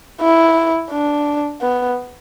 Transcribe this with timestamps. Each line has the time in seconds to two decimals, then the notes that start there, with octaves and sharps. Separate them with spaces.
0.21 E4
0.90 D4
1.61 B3